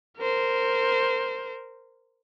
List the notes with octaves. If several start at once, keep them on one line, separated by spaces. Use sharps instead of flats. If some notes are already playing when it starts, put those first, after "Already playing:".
A#4 C5